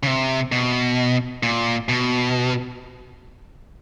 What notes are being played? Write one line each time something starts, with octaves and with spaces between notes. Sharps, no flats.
C#3
C3
B2
A#2
B2